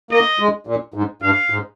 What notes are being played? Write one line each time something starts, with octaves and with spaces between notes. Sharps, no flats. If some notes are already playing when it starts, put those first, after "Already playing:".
A#3 D#5
G#3
A#2
G#2
G2 F5
G#2